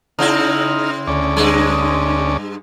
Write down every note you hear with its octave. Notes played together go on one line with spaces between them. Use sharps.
C#3 C4 D#4 E4 F6
D2 C#4 D5
G2 G#3